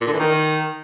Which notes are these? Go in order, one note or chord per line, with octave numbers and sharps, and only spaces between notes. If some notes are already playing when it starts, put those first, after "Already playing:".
A#2
D3
E3
D#3